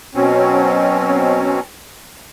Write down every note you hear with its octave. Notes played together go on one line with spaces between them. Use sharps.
B2 F#3 C4 C#4